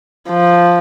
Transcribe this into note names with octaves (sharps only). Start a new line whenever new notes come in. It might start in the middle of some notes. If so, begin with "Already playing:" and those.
F3